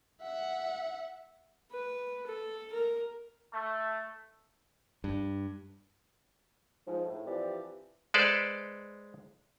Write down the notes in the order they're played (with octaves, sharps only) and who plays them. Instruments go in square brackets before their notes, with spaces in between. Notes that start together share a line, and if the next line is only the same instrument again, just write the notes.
[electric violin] E5 F#5
[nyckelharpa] B4
A4
A#4
[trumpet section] A3
[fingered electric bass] G2
[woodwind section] G#2 F3
A2
E3 F3 G3 C4 G4 D5
[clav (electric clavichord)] G#3 A4 B4 C5 D5